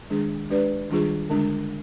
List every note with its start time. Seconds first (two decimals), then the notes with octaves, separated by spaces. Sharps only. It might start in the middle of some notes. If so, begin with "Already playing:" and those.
0.10 D#3 G#3 D4 G#4
0.50 G#3 D4 G4 B4 D5
0.90 D#3 G3 D4 F4 G#4
1.30 D3 G#3 D4